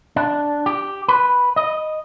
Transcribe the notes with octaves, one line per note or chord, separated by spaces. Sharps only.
D4
G4
B4
D#5